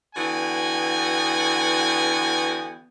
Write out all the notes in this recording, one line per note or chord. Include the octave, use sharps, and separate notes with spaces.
D3 E3 B3 F#4 G5 G#5